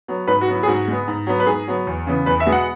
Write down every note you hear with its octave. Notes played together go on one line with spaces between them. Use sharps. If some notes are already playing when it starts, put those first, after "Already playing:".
F#3 B3
G#2 B4
F#4
F#3 B3
E4
G#4
G#2 F#4
G#3 B3
G#2
F#3 B3
B4
G#2 G#4
F#3 B3
E2
C#3 E3 B3
E2 B4
E5
B2 G#3 B3
F#5